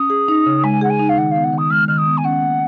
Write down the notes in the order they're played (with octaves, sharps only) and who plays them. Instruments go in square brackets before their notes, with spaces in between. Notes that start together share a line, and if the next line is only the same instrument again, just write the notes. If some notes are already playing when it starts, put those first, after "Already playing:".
Already playing: [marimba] C#4 [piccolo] D#6
[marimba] G#4
D#4
C#3
[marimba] G#3 [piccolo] G#5
[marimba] G#4 [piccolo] F#5
[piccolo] G#5
[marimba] D#4
[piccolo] F5
[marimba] D#3 [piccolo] F#5
[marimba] B3 [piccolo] F5
[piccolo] F#5
[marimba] D#3
[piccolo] D#6
[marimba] G#3 [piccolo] F6
[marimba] D#3 [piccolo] F6
[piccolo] D#6
[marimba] B3
[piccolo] G#5
[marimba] C#4 [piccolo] F#5
[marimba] A#3